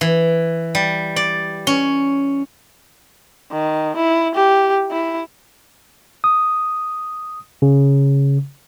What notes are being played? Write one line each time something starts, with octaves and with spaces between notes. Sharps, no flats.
E3
G3
D5
C#4
D#3
E4
G4
E4
D#6
C#3